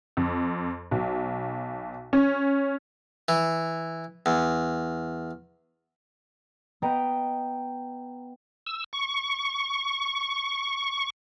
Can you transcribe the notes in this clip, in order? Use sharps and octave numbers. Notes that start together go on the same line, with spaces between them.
F2
B1
C#4
E3
E2
B3 D#5 G5 A#5
E6
C#6